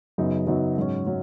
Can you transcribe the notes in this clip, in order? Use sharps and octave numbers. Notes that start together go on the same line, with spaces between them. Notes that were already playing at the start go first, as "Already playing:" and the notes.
F#2 C#3 F#3 B3 D#4
F#2 C#3 F#3 B3 D#4
G#2 F#3 C#4
F#3 C#4